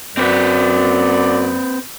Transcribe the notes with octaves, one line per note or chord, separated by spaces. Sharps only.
F#2 C4 B4 D5